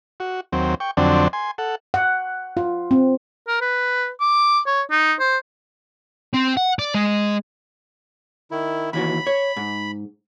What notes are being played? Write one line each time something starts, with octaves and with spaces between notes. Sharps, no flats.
F#4
D#2 F#3 C4
G5 C#6
F2 D3 F#3 C4 D4
G#5 C6
A4 F#5
F#5
F4
C4
A#4
B4
D6
C#5
D#4
C5
C4
F#5
D5
G#3
D#3 E4
D#2 E3 F#4 B5
C#5
G#2